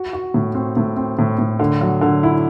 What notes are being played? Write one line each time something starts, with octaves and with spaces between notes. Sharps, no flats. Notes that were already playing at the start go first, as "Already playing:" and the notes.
Already playing: F#4
F#4
A2
C4
A2
C4
A2
A2
D3
F#3
D3
E4